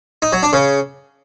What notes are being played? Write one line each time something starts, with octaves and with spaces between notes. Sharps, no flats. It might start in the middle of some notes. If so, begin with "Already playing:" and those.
D#4
F#3
D4
C#3